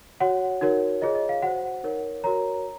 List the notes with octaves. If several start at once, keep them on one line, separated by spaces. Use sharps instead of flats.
F#4 C#5 F#5
D#4 F#4 A#4 C#5
F4 G#4 C#5 D#5
D#5
F5
F#4 C5 F#5
D#4 A#4 C#5
F#4 A#4 C#5 A#5